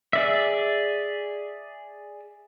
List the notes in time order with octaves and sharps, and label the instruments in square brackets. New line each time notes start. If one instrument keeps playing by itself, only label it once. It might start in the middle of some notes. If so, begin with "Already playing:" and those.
[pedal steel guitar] G#4 D5 E5